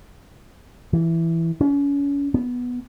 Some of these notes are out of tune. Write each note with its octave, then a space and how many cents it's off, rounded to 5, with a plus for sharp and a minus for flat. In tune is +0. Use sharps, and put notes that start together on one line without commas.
E3 +5
C#4 +35
B3 -5